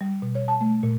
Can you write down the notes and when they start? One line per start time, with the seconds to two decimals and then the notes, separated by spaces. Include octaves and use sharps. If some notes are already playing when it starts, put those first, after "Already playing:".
0.01 G3
0.22 B2
0.35 C#5
0.48 A5
0.61 A3
0.83 A#2